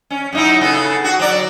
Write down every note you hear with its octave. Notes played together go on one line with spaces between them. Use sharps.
C#4
F#2 D#4 E4
C#3 B3 A4
F#4
F#3 D5